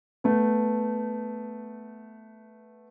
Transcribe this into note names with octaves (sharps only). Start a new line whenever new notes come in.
A3 B3